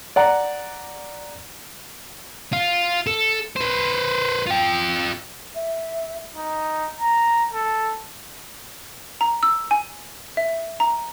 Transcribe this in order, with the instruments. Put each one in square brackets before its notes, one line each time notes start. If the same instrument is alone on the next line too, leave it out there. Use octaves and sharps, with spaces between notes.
[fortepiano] D5 F#5 A#5
[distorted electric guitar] F4
A4
B4 C5
F4 G5
[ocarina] E5
[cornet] D#4
A#5
A4
[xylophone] A#5
E6
G#5
E5
A#5